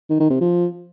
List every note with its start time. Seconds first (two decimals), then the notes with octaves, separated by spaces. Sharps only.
0.10 D#3
0.20 D#3
0.30 C3
0.41 F3